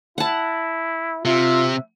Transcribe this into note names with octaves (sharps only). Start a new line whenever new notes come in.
E4 F#5 A5
C3 F4 E5